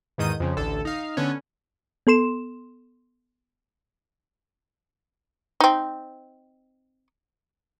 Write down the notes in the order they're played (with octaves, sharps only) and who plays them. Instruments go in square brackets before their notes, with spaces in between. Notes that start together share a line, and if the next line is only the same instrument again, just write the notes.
[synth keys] E2 G#2 D#3 D#6 G6 D#7
F2 C#3 F3
A1 D2 D3 A4
D#4 F5
D3 B3 C#4
[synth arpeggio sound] B3 A4 C6 E7
[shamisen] C4 D#4